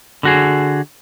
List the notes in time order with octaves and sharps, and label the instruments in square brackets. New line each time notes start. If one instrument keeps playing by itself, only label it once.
[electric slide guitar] D3 F#4 G#4